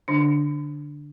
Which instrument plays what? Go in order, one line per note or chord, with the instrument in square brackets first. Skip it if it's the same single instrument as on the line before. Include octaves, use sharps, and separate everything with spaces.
[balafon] D3 D4